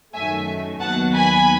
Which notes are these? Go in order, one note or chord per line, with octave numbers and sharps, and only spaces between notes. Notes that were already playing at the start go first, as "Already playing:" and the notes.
F#2 D#3 F#3 A3 E5 G#5
D#2 D#3 F#3 B3 F#5 A5
G#5 B5